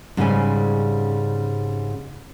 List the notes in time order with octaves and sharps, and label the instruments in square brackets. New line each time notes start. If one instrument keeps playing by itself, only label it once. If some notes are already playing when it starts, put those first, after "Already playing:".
[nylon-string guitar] G#2 C#3 G3 C4 C#4 G#5